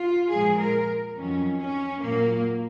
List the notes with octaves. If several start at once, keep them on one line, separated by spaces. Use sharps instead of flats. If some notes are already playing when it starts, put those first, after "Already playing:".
Already playing: F4
A#2 F3 G#3 G#4
A#4
F2 D#3 F#3 C#4
C#4
A#2 F#3 A#3